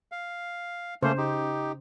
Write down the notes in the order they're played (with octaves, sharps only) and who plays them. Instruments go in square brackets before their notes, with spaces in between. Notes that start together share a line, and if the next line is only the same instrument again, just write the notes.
[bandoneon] F5
[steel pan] C#3 C5 [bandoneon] A3 A#3 C#4
[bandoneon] D#4 G4